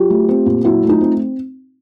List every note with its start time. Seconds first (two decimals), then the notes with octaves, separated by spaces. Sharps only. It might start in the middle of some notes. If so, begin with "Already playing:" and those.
Already playing: F#3 F4 G4
0.10 A3
0.29 C4
0.46 A#2
0.64 F#3 E4 F#4
0.83 A3
0.89 D#4 F4
1.01 C4